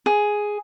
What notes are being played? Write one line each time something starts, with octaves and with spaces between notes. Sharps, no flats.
G#4